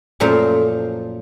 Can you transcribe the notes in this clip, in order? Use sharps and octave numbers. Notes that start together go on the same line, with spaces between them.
F#2 A#2 F3 A3 A#4 C5